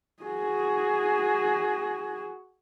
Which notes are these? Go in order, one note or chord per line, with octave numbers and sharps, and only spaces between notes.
F#4 G#4